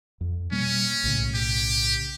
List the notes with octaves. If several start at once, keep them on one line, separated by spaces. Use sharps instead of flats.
F2
B2 G3 A#3 C#4
B1 A2 C#3
G4